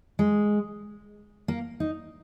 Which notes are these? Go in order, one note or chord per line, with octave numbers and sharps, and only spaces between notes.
G#3
A#3
D#4